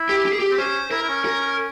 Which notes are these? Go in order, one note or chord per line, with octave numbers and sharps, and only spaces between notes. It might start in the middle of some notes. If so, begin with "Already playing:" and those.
Already playing: E4
G4
G4
G#4
G4
C4
C#4 C5
E4 A#4
E4
C#4
A#4